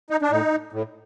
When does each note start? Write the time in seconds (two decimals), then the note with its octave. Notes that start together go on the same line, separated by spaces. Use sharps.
0.10 D#4
0.22 D4
0.31 A2 D#4
0.73 A2